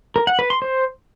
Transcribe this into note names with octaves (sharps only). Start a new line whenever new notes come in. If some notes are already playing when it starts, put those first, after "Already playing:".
A#4
F#5
B4
C6
C5